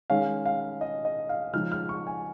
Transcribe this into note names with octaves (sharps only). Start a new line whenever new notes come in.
D#3 G#3 C#4 F5
F5
D#5
D#5
F5
C#3 F3 G#3 D#4 F6
F6
C#6
G#5